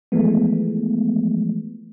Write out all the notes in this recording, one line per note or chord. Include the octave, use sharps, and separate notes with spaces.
E3 F3 G#3 A3 B3